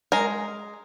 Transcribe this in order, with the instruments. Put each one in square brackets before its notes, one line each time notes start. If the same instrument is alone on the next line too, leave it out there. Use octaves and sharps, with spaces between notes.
[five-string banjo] G#3 A#4